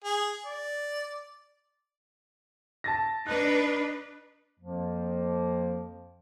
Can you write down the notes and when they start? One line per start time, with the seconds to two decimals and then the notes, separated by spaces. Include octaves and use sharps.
0.04 G#4
0.46 D5
2.84 A5 A6 A#6
3.27 D4 D#4 B4 F#6
4.59 F2 F3 A#3